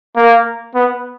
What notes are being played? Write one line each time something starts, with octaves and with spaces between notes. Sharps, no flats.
A#3
B3